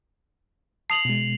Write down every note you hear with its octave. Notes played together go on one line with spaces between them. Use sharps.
A5 D#6 C7 F7 F#7
B2 G#3